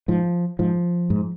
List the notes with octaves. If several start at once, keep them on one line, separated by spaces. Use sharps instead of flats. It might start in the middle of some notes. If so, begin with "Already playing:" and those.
G#2 F3
G#2 F3
G#2